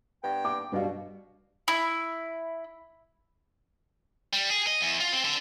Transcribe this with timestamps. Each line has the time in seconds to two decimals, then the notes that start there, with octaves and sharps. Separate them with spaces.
0.23 G2 B3 G5
0.45 D6
0.72 G2 B2 F5
1.68 E4
4.33 G3
4.50 G#4
4.67 D#5
4.81 E2
5.00 F4
5.12 C4
5.25 D3